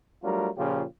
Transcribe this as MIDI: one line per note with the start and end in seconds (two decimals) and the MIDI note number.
0.23 0.48 54
0.23 0.48 55
0.23 0.48 57
0.23 0.48 62
0.23 0.48 65
0.23 0.48 70
0.57 0.84 46
0.57 0.84 49
0.57 0.84 53
0.57 0.84 61
0.57 0.84 65
0.57 0.84 67